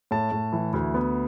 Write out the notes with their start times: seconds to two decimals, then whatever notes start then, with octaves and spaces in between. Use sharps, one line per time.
0.11 A2 A5
0.32 A2
0.53 E3
0.73 D2
0.94 B3